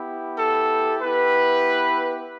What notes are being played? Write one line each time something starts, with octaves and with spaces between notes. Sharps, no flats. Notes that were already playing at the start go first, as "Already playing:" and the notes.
Already playing: B3 E4 G4
A4
B3 E4 G4 B4